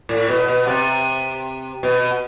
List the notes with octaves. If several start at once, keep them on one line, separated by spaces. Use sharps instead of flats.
A2
B2
B2
C3
B2